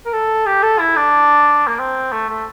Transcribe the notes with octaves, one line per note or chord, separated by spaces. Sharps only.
A#4
A4
G4
A4
E4
D4
A#3
C4
A3
A3